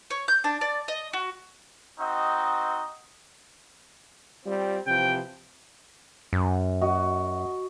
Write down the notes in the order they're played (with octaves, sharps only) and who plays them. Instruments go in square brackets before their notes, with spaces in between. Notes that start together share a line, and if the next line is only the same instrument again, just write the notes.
[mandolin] C#5
G6
D4
D5
D#5
F#4
[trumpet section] C4 D#4 F#4 D#5
[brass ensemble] G3 C4 F4
[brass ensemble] C3 E3 F3 [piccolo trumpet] G5
[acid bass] F#2
[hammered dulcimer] F#4 D#5 F#5